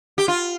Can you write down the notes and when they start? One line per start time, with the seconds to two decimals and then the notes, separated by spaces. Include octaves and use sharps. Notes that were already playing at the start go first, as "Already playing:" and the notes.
0.18 G4
0.28 F4